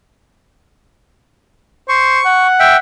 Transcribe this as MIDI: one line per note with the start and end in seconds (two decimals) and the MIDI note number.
1.89 2.20 72
1.89 2.47 85
2.25 2.79 78
2.60 2.77 76
2.60 2.77 79